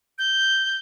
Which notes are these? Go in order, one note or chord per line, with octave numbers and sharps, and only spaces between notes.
G6